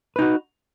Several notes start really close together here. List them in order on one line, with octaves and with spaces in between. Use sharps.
B4 D#4 F#4